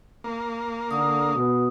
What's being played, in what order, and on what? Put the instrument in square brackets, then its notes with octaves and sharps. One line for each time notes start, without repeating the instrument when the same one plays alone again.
[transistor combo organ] A#3
[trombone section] D3 [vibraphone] D#6
[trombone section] B2